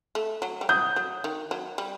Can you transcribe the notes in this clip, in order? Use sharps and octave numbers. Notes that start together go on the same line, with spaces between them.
A3
F#3
G3
F#3 D#6 G6
F#3
D#3
F#3
G3